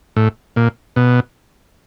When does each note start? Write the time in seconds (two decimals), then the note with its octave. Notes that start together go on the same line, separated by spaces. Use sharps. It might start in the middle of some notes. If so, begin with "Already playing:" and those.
0.16 A2
0.56 A#2
0.96 B2